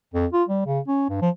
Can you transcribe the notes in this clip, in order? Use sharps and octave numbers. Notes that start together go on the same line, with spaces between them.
F2
F4
G3
C#3
C#4
G2
F3